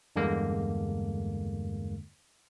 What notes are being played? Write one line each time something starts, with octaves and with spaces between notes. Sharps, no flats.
E2 G2 D3 G#3 A#3